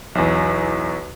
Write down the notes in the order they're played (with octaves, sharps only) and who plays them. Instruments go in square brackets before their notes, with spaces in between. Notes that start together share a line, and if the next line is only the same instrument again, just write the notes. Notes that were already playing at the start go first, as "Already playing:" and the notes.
[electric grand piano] B1 E2